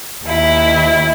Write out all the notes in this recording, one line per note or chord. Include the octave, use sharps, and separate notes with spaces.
D#2 E4